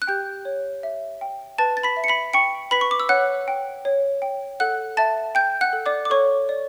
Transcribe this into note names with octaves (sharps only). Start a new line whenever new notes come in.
F#6
G4 G5 G6
C#5
E5
G5
B4 A5 A6
A6
B5 B6
E5
C#7
B5 B6
G5 C#6 C#7
B4 B5 B6
C#6
D6
E6
C#5 F#5 F#6
G5
C#5
G5
A4 F#5 F#6
E5 A5 A6
G5 G6
F#5 F#6
A4
D5 D6
D6
A4 C#5 C#6
D5